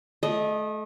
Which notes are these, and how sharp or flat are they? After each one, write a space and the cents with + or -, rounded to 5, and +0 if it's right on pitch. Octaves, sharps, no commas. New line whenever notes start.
A3 -30 D#5 +0